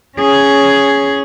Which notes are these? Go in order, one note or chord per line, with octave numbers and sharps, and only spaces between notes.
C#4 G#4